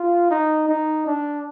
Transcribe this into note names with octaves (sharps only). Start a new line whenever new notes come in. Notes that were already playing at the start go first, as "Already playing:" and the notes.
Already playing: F4
D#4
D#4
D4